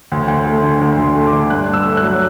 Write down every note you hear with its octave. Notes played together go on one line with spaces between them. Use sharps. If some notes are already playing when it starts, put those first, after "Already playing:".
D2
D2
A3
D3
D2
D2
C6
A3
D6
D3
G2 F#6
G2
E6
A3
F#6
F#3